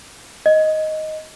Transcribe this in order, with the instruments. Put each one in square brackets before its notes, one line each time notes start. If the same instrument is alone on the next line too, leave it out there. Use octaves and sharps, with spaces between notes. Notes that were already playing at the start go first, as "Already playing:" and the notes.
[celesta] D#5